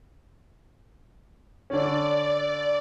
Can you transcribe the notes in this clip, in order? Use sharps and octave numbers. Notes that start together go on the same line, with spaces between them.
D3 C#4 D5